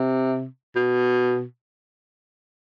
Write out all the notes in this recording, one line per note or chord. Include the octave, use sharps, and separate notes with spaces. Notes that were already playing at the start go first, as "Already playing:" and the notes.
Already playing: C3
B2